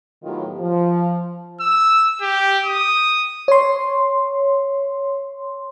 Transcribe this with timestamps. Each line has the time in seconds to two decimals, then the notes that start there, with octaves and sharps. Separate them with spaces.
0.24 A2 D#3 F#3 B3 F4 G4
0.60 F3
1.61 E6
2.21 G4
2.65 D#6
3.48 C#5 C6